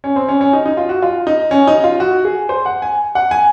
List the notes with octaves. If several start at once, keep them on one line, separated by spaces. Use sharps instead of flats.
C#4
C4
C#4
C#4
D#4
D#4
F4
F#4
F4
D#4
C#4
D#4
F4
F#4
G#4
C5
F#5
G#5
F#5
G#5